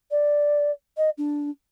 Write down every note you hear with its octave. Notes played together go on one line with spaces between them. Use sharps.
D5
D#5
D4